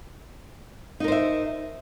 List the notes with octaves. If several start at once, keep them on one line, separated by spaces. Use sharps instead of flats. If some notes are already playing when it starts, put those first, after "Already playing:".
D#4 A#4 C5 E5